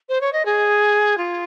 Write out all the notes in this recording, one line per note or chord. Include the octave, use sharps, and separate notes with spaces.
C5
C#5
D#5
G#4
F4